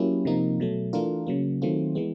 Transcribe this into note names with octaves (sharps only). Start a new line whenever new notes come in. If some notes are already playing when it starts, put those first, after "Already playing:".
Already playing: F#3 A#3 C#4 E4 G4
C3 F3 A#3 D#4
B2 F#3 A3
E3 A3 D4 F4 A#4
C#3 F#3 A#3
D#3 F#3 A3 C4 F4
E3 G#3 B3